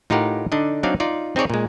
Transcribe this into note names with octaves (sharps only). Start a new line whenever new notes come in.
A2 D#4 F4 G4 A#4 F#5
D3 D4 D#4 D#5
F#3 C4 D4 D#4 D5 F5
D#4 F4 D5
C4 D#4 G#4 C#5 D5
A#2 G#3